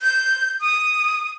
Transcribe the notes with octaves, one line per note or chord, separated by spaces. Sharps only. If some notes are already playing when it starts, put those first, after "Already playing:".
G6
D#6